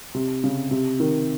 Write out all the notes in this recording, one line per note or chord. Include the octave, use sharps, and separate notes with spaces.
C3
C#3
C3
D#3